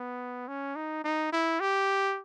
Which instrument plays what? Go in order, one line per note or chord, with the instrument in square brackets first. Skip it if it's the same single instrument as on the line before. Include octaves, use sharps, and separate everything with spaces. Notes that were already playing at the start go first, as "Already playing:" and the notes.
Already playing: [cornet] B3
C#4
D#4
D#4
E4
G4